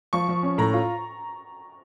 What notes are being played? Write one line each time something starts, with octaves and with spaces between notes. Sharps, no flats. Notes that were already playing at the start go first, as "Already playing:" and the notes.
F3 C#6
F3
C#4
A2 A#5
F4